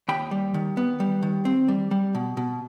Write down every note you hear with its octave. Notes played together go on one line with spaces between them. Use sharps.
D#2 G5 B5
G3
D#3
B3
G3
D#3
C4
G3
G3
B2
B2